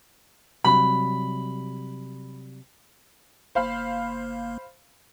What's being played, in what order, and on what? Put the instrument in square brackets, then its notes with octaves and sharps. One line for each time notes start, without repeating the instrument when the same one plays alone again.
[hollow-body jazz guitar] C3 F#3 G3 [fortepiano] B5
[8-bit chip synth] G1 A#3 [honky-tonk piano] C5 F5 B5